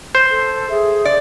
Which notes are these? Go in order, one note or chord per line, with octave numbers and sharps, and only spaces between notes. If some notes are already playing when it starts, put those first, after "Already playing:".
C5
A4
G#4 E5
D5